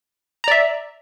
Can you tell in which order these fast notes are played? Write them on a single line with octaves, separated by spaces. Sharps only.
A#5 D5 E5